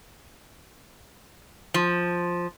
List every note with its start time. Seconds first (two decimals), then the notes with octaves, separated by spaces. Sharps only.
1.74 F3